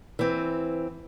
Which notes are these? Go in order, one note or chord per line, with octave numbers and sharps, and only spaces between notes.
E3 C4